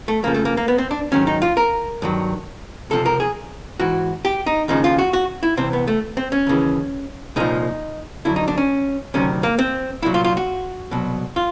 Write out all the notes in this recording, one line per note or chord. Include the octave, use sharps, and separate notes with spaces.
A3
F2 C#3 F3 A#3
A3
A#3
A#3
B3
C4
D4
G#2 D#3 F#3 C#4
D#4
F4
A#4
G2 D#3 F#3
C#2 C3 F3 A4
A#4
G#4
G#2 E3 F#4
G4
D#4
D#2 C#3 F3 D#4
F4
F#4
F#4
E4
C2 C3 E3 C4
B3
A3
C4
C#4
D#2 C#3 E3
C2 A#2 F3 D#4
F2 D3 F#3 E4
D#4
D4
C#4
D2 C3 D#3 F#3 C#4
A#3
C4
C2 A#2 F#3 E4
F4
F4
F#4
C2 B2 F#3
F4